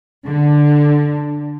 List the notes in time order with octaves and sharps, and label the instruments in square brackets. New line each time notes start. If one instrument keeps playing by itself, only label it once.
[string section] D3